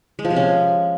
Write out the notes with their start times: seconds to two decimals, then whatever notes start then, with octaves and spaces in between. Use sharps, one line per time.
0.19 G#3
0.25 F3
0.30 C3
0.36 C#4